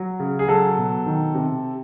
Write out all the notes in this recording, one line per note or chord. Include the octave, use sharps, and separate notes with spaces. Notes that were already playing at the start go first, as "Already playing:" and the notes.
Already playing: F#3
C#3
G#4
F#3 A4
B2
D#3
C3